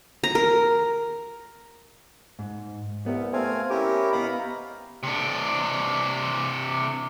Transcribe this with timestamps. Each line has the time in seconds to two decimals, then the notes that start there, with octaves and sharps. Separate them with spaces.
0.24 A#5
0.35 A#4
2.39 G#2
3.06 C2 B3
3.33 A3 C4 F5 G#5
3.70 C#4 E4 G4 A#4
4.13 B3 D#5 F5 A#5 B5
5.03 C3 D4